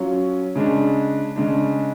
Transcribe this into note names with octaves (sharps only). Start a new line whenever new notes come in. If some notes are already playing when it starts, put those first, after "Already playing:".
Already playing: F#3 C#4 F4
C#3 G#3 D4
C#3 G#3 D4